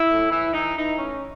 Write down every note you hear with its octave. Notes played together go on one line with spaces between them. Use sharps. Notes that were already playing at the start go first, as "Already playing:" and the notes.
Already playing: E4
A2
E3 E4
E3 D#4
E3 D#4
A2 C#4